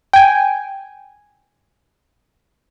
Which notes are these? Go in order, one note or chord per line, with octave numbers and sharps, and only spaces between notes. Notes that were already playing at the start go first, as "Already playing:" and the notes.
G5 G#5